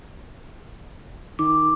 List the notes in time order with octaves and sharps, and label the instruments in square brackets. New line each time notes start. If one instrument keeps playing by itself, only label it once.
[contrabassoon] D#3 [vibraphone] D6